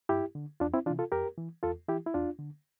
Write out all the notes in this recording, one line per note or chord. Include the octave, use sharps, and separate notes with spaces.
G2 E4 G4
D3
E2 D4 F4
C4 E4
C3 E3 D4 F4
F4 A4
F2 G4 A#4
E3
E2 F4 A4
E3 E4 G4
E4
E2 D4 F4
D3